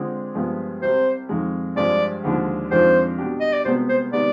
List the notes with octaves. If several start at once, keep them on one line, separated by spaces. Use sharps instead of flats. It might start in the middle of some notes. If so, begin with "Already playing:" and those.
Already playing: D3 G#3 C4 F4 G#4
G2 F3 G#3 B3
C2 C3 G3 C5
F2 D#3 G#3
G2 F3 G#3 D5
D#2 D3 F3 G#3 D4
F2 D#3 G#3 D4 F4 C5
B2 G3 D4 G4
D#5
D5
C2 B2 G#3 B3 C5
C5
C3 D#3 G#3 B3 D5